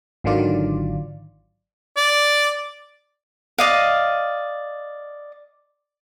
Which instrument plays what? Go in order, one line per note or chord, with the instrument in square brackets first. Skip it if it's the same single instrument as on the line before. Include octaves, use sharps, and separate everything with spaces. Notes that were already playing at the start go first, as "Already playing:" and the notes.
[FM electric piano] G#1 D3 D#3 F#3 F4 D5
[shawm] D5
[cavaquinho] D5 D#5 F5